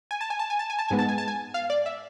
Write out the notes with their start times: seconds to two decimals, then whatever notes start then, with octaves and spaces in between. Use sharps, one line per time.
0.11 G#5
0.21 A5
0.30 G#5
0.39 A5
0.50 G#5
0.59 A5
0.70 G#5
0.79 A5
0.88 G#2 G#3 B3 G#5
0.99 A5
1.09 G#5
1.18 A5
1.28 G#5
1.54 F5
1.70 D5
1.86 E5